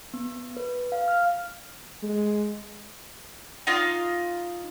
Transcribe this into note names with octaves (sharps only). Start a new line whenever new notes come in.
B3
B4
F5
F6
G#3
D#4 F4